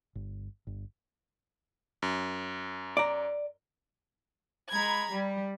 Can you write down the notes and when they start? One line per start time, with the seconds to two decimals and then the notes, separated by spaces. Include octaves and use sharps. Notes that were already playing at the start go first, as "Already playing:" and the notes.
0.15 G1
0.67 G1
2.02 F#2
2.97 D5 A#5
4.70 G#3 A#5 B5 G#6
5.11 G3